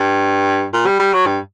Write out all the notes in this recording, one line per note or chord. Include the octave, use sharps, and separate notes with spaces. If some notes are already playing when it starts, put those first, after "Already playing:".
Already playing: G2
A#2
G3
G3
F#3
G2